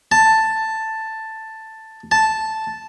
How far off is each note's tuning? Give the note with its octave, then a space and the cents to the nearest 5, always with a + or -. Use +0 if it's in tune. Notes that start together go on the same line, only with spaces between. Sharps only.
A5 +5
A5 -5